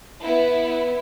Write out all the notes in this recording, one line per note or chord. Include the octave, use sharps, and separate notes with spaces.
B3 E4